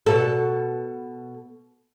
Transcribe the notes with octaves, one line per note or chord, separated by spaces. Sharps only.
B2 A4